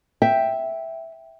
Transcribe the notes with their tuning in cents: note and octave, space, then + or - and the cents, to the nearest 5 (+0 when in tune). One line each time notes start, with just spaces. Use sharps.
E5 +0 G5 +0